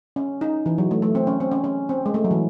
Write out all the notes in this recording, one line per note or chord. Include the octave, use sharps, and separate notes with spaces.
C#4
D#4
E3
F#3
A3
A3
C4
C#4
C4
C#4
C#4
C4
G#3
A3
F#3
E3